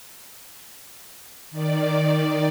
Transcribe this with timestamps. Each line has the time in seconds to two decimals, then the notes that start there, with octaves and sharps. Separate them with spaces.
1.51 D#3 D5